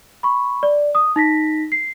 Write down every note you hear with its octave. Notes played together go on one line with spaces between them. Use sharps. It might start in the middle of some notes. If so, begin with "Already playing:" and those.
B5 C#6
D5
D#6
D#4 A#6 B6
C7